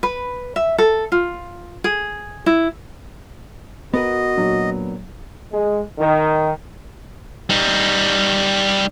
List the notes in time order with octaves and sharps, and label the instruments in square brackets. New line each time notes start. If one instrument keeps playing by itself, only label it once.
[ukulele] B4
E5
A4
F4
G#4
E4
[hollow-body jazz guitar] B3 A#4 B4 [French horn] F#4 [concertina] D#5
[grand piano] A#2 F#3 D4
[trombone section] G#3
D#3
[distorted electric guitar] G3 D#4